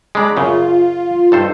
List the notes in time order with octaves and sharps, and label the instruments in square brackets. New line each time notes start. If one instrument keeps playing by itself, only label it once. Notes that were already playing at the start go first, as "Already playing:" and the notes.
[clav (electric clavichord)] G#3 D4 [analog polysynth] A#5 B5 D6
[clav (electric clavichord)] F#2 C#3 [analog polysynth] F4
[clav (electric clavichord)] G2 A4 C5 [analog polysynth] D#4